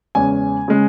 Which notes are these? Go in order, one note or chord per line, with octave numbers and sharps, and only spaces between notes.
E2 C#3 G#3 C#4 G#5
C#3 G#3